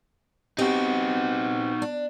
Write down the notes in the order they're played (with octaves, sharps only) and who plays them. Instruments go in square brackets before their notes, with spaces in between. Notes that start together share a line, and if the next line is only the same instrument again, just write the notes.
[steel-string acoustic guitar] B3 C4 G4 [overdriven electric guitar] D#4 F#4
[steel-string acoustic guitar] D4